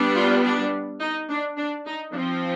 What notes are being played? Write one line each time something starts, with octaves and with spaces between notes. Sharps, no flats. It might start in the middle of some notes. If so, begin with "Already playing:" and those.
Already playing: G3 B3 D4
F4
D4
D#4
D4
D4
D#4
F3 C4 D4